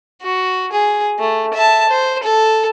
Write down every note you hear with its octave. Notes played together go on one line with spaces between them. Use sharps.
F#4
G#4
A3
E5 A5
C5
A4